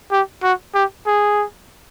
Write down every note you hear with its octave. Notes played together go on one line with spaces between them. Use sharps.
G4
F#4
G4
G#4